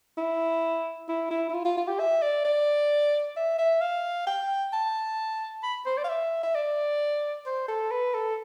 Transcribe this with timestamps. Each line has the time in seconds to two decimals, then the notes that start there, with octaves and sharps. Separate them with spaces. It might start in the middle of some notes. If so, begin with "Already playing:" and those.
0.18 E4
1.08 E4
1.30 E4
1.50 E4
1.54 F4
1.65 F4
1.77 F4
1.88 G4
1.99 E5
2.22 D5
2.45 D5
3.36 E5
3.59 E5
3.81 F5
4.27 G5
4.73 A5
5.63 B5
5.86 C5
5.97 D5
6.04 F5
6.09 E5
6.43 E5
6.55 D5
7.46 C5
7.68 A4
7.91 B4
8.14 A4